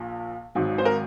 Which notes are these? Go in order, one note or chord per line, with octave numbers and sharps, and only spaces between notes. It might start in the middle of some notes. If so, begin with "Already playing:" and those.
Already playing: A#1 A#2
G#1 G#2 F#3
C5
A#4